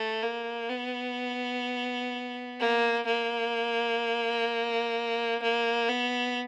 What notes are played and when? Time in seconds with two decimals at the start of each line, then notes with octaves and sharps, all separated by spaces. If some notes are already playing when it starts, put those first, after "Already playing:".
Already playing: A3
0.23 A#3
0.70 B3
2.59 A#3
3.06 A#3
5.42 A#3
5.89 B3